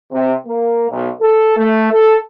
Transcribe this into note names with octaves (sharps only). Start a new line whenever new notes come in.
C3
A#3
B1
A4
A3
A4